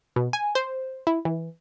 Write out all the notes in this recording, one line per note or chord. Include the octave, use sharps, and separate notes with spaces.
B2
G#5
C5
E4
E3